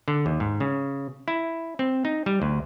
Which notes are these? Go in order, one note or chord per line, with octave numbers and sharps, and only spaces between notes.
D3
D#2
G#2
C#3
E4
C4
D#4
G3
D2